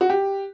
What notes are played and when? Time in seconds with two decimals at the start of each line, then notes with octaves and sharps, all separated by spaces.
0.01 F#4
0.10 G4